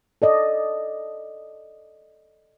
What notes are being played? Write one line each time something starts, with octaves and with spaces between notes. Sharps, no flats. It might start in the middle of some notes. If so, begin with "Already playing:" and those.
A4 D5 D#5